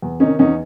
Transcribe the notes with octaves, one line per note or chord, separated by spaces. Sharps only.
E2
C3 D#3 C#4 D#4
E2 C#4 D#4